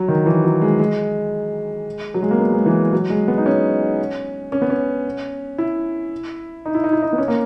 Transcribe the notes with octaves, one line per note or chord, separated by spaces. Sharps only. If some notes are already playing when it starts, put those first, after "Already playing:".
Already playing: F#3
D#3
E3
F#3
G#3
G#3
F#3
G#3
A#3
B3
G#3
E3
F#3
G#3
B3
D#4
C#4
C#4
B3
C#4
E4
D#4
E4
D#4
E4
D#4
B3
C#4
A#3